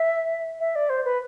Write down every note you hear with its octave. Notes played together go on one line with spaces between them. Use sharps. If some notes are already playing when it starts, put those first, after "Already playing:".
Already playing: E5
E5
D5
C5
B4